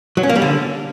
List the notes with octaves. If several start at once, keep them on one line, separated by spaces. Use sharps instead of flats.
F#3
C#4
A#3
G3
D3